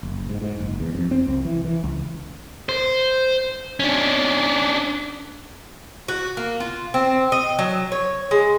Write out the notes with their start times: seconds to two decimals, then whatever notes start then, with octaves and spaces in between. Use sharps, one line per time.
0.03 F#1
0.29 G#2
0.42 G#2
0.60 F#1
0.80 E2
0.94 F2
1.11 C4
1.28 C2
1.45 E3
1.64 E3
1.84 C#2
2.69 C5
3.80 C#4 D4
6.08 F#4
6.37 A#3
6.60 F4
6.94 C4
7.32 D#5
7.59 F#3
7.92 C#5
8.31 G#3